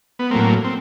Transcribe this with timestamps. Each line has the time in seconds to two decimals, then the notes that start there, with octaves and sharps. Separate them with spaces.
0.19 B3
0.31 A2 F#3 A#3 C4
0.64 C4